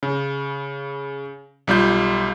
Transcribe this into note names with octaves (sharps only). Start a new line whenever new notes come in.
C#3
B1 G3 F4 G6